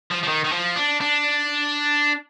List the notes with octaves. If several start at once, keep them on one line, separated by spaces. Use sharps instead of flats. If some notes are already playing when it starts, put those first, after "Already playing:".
F3
F3
D#3
D#3
F3
D4
D4